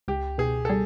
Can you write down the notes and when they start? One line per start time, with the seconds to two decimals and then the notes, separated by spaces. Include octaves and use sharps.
0.08 C#2 G4
0.38 B2 G#4
0.65 A4
0.69 G3 G#4